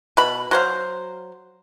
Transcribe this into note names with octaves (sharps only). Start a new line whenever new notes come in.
B2 B5
F#3 C5 F5